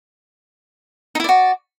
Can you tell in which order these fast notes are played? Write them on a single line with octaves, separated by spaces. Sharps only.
D#4 E4 D5 F#4